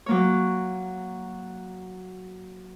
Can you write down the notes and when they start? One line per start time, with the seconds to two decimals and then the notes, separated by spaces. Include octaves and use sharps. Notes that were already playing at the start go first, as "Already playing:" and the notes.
0.06 F#3 A#3 C#5